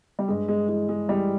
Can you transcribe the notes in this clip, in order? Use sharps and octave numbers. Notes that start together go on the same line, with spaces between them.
G3
G2 G#3
G#3
E3 G#3
G#3
E3 G3